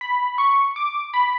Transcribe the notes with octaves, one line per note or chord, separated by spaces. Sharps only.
B5
C#6
D6
B5